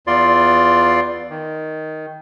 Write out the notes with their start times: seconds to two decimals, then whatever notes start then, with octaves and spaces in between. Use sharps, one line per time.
0.07 E2 F4 D5 C6
1.30 D#3